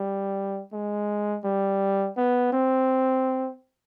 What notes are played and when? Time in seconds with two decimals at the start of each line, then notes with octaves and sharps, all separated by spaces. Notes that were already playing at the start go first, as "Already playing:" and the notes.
Already playing: G3
0.72 G#3
1.44 G3
2.17 B3
2.52 C4